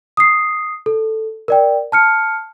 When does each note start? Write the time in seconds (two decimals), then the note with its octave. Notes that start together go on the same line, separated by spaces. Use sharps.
0.17 D#6 C7
0.86 A4
1.48 A#4 D5 G5
1.92 A5 F6 C#7